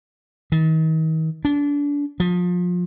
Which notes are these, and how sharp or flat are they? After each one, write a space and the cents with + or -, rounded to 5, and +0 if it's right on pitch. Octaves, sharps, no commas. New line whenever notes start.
D#3 +40
D4 -30
F3 +30